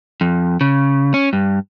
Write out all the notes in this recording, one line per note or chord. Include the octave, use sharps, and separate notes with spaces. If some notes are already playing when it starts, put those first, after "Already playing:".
F2
C#3
C#4
G2